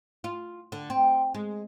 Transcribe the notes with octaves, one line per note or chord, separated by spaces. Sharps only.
F4
D3
C4
G#3